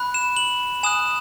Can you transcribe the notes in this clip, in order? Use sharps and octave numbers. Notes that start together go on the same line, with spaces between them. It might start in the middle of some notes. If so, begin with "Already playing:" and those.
Already playing: B5 F#6
E7
F#7
G#5 D#6 F#6 E7